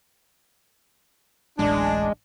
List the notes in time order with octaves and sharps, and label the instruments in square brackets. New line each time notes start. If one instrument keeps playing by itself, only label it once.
[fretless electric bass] D1 A1 [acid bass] G#3 [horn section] D4